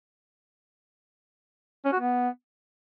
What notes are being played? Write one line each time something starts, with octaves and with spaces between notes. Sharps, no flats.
C#4
F#4
B3